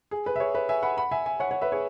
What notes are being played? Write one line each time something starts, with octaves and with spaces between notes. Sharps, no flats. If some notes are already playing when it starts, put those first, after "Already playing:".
G#4
B4
E5
G#4 C#5
B4 E5
E5 G#5
F#5 B5
F#5 B5
E5 G#5
E5 G#5
C#5 F#5
C#5 F#5
B4 E5
G#4 C#5